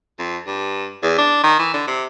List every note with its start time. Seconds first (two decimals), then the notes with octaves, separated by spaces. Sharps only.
0.19 F2
0.47 G2
1.03 E2
1.18 D4
1.44 D#3
1.59 E3
1.74 D3
1.87 C3